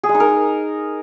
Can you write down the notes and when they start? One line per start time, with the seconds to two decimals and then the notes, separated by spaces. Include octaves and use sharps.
0.04 G#4
0.09 G#3
0.15 D#4
0.20 A#4